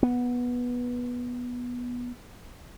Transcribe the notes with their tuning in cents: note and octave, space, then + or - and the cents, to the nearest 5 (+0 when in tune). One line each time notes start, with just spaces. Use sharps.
B3 -10